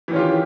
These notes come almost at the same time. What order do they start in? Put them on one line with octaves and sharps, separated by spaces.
E3 D#3 C#4 F4 G4